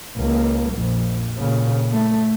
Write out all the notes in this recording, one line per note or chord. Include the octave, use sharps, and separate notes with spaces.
C#2 A#3
A#1 F2
A#2 C#3
A3